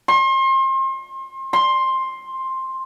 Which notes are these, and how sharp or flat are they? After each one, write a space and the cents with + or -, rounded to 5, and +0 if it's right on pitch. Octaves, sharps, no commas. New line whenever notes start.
C6 +35
C6 +10